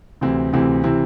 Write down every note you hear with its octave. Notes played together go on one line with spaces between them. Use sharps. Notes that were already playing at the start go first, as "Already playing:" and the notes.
D2 C3 E3 C4 E4
D2 C3 E3 C4 E4
C3 E3 C4 E4